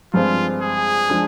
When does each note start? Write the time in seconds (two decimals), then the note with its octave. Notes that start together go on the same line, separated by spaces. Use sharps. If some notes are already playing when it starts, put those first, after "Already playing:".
0.14 G2 F3 G#3 C4 F4
0.61 G#4
1.10 F3 G#3 D4